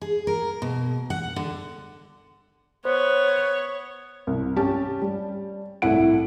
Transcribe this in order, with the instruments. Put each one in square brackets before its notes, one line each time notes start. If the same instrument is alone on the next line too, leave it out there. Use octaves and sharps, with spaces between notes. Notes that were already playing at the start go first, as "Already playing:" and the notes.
[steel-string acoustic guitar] G#4
A#4
B2
F#5
D3
[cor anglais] B3 [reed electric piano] C5 [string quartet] C#5
[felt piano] C2
C#4 G4 A5
G3
C2 A2 E4 F#5 D7